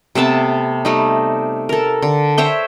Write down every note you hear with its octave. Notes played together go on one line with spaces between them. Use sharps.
C3 A3 B3 A5
G3 A3 D#4
A4 A#4
D3
C5 C#5 E5 G5